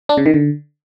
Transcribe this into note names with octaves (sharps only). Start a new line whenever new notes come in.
D4
C#3
D#3
D3